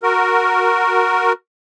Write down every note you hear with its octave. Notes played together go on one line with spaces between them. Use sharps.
F#4 A#4